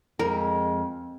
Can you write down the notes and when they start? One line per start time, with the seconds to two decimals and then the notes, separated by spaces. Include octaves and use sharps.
0.19 F2 G#3 A#4